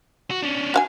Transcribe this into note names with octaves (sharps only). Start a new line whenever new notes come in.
F#4
C#4 D4
F#4 F5 G#5